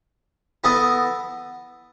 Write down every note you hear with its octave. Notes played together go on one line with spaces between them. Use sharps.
B3 E4 A4 D#5